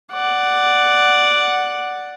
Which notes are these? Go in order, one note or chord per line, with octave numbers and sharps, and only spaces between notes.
D5 F#5